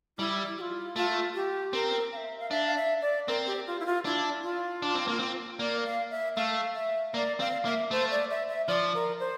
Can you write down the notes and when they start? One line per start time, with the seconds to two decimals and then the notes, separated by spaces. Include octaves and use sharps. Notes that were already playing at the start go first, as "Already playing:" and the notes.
0.19 G3 E4
0.57 G4
0.61 F4
0.96 A3 F4
1.35 G4
1.73 C4 A#4
2.12 F5
2.17 E5
2.40 F5
2.50 D4 E5
2.67 F5
2.76 E5
3.01 D5
3.28 C4 A#4
3.47 G4
3.67 F4
3.80 E4
3.86 F4
4.05 D4 E4
4.43 F4
4.82 D4
4.95 C4
5.07 A#3
5.19 C4
5.59 A#3 D5
5.85 F5
6.11 E5
6.36 A3 F5
6.75 E5
7.14 A#3 D5
7.40 C4 F5
7.65 A#3 E5
7.91 A3 C5
8.11 D5
8.30 E5
8.49 E5
8.68 F3 D5
8.94 A#4
9.20 C5